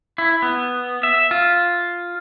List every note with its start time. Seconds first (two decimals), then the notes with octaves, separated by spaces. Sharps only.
0.18 E4
0.42 B3
1.03 E5
1.31 F4